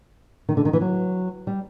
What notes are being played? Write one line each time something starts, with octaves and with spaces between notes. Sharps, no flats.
D#3
D3
D#3
E3
F#3
G3